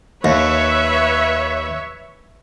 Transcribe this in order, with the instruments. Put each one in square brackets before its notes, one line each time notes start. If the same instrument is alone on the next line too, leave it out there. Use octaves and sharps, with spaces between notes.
[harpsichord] D#2 [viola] B4 [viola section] C#5 E5